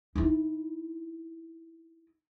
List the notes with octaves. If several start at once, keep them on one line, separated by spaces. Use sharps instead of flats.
D#4 E4